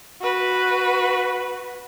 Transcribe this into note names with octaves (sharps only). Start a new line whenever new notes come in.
F#4 B4